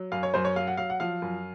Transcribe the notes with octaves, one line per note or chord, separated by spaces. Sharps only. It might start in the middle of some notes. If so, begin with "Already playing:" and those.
Already playing: F#3
F#2 F5
C#5
F#2 C5
C#5
F#3 F5
F#5
F#3 F5
F#5
F3 F5
F#2